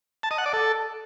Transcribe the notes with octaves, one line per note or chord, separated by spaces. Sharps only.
A5
D#5
F#5
D5
A4